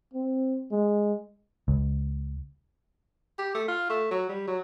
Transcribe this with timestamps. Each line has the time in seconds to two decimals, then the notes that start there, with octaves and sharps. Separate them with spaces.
0.14 C4
0.71 G#3
1.68 C#2
3.38 G4
3.54 A3
3.68 F4
3.90 A3
4.11 F#3
4.29 G3
4.47 F#3